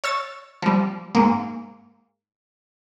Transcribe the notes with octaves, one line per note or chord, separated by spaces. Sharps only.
C#5 E6 A6
F3 G3
G#2 A#3